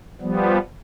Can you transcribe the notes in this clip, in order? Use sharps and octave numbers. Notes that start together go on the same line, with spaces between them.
F3 G3 B3